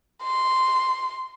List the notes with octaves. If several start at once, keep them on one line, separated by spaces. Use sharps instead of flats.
C6